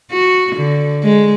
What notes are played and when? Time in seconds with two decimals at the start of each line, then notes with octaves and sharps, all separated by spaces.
0.11 F#4
0.56 D3
1.04 G#3